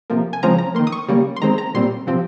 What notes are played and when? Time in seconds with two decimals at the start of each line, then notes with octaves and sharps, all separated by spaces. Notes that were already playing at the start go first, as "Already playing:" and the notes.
0.10 C3 F3 A#3
0.33 G#5
0.43 C#3 F3 G#3 C4 A#5
0.58 A#5
0.75 D#3 A#3 C6
0.87 D#6
0.92 C#6
1.09 C#3 G3 A#3
1.36 C6
1.42 D#3 G#3 C4 A#5
1.58 A#5
1.75 A#2 G3 C4 C6
2.07 C3 F3 C4